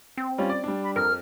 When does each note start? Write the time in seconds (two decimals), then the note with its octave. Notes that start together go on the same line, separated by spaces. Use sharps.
0.17 C4
0.38 G3 C#4 F4
0.50 D5
0.64 G3 D4
0.84 B5
0.96 F2 A#4 F6